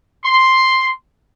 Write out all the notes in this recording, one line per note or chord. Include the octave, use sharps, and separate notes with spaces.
C6